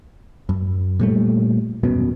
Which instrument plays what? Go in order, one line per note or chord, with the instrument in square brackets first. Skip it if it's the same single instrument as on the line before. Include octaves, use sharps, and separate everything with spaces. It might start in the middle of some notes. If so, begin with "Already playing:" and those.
[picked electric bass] F#2
A#2 G3 A3
D#1 F#2 B2 B3